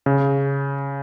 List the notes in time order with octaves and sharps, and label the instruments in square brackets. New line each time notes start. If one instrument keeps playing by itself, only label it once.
[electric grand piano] C#3